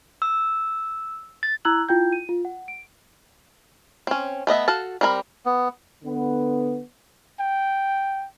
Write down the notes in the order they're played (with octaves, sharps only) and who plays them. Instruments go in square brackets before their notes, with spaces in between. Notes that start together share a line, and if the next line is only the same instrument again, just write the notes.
[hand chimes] E6
A6
[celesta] E4 A#5 E6 F#6 G#6 F#7
E4 F4 G5 G6
D#7
F4
F#5
D7
[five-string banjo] C4 C#4
A3 B3 D#5 E5
F#4 A4 F5 A5
G3 C4 A#4 B5
[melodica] B3
[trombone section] D3 B3
[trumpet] G5